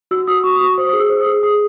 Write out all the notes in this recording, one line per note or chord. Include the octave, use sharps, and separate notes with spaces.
F#4 E6
F#4 D#6
F#4 C#6
D#6
F#4 C#6
C5 D#6
G#4 D#6
E6
C5
D#6
G#4
G#4 D#6